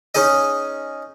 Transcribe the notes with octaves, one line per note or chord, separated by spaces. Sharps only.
C#4 D#4 G#4 D#5